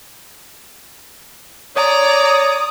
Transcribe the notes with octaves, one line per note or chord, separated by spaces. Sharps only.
C#5 D5 A#5 D#6